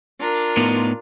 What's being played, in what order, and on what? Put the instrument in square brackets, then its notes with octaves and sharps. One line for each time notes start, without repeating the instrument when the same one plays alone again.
[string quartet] D4 F4 A#4
[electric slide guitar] A2 B3 D#4